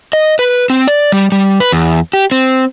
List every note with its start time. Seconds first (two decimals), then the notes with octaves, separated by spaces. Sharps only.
0.13 D#5
0.39 B4
0.70 C4
0.87 D5
1.12 G3
1.32 G3
1.60 B4
1.72 E2
2.13 G4
2.31 C4